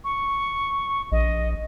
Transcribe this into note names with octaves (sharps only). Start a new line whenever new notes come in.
C#6
A#1 D#5